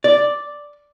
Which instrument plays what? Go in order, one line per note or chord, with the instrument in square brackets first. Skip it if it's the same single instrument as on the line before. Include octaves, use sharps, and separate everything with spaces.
[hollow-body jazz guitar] D5